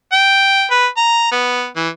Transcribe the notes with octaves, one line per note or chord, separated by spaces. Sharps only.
G5
B4
A#5
B3
E3